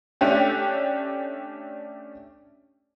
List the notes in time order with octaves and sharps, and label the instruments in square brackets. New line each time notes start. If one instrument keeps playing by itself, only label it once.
[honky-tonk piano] A3 C#4 D4 G4